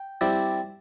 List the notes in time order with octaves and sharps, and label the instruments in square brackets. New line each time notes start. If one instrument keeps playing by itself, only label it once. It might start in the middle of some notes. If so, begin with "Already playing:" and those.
Already playing: [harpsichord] G5
G3 C4 E4